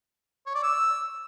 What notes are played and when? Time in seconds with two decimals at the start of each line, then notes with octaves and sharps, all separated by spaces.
0.46 C#5
0.55 D5
0.63 E6